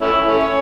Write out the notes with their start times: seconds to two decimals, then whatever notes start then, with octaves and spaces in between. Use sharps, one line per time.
0.02 A3 C#4 E4
0.27 A3 C#4
0.40 C#5